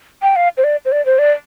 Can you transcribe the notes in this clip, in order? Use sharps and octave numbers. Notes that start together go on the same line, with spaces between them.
G5
F5
C5
D5
C5
D5
C5
D5